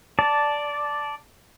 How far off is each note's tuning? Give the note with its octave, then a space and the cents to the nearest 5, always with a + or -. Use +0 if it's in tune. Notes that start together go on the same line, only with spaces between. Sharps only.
D5 -5 A5 +0